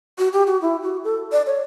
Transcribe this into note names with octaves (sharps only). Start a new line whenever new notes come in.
F#4
G4
F#4
E4
F#4
A4
D5
C#5